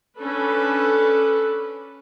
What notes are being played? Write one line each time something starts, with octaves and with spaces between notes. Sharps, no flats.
C#4 D4 A4 B4